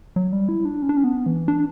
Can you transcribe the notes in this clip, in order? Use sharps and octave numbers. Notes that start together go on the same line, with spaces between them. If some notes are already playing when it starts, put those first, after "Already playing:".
F#3
G3
E4
D4
C#4
D4
C#4
B3
E3
D4